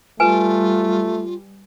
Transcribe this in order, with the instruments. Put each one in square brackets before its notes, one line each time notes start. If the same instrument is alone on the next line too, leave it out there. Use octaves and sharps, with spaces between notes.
[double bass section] G3 [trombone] A3 [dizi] F4 [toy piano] B4 G#5